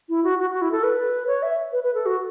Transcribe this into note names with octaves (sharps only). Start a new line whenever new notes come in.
E4
F#4
F#4
F#4
E4
A4
B4
C#5
E5
B4
B4
A4
F#4